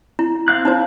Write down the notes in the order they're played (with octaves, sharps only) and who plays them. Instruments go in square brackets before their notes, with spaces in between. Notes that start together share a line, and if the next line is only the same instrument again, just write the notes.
[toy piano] E4
[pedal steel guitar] C4 F5 F#6
[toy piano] D#4 E4 C5